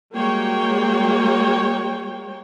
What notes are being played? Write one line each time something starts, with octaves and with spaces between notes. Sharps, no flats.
G3 G#3 A#3 F#4 C#5 G5